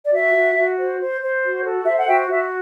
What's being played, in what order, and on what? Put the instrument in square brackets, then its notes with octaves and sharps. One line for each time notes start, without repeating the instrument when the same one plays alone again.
[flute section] D5
F#4 E5
F#4
F#4
C5
C5
C5
F#4
A4
C5 E5
F#5
F#4 E5 G5
F#4 E5